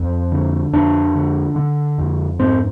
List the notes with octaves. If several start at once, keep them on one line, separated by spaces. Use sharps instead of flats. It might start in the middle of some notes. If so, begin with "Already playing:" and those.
Already playing: F2 C4
D3
F2 D4
D3
D3
F2
G#2 C4